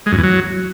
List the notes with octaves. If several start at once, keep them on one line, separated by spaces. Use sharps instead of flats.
G#3
F#2
E2
F#3